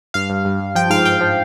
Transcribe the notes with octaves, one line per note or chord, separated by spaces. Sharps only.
G2 F5
G2
G2
G2
F3 G5
G#2 F5
G#2 G5
F3